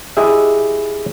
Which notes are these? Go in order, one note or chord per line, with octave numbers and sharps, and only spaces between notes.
E4 G4 G#4 D#5 E5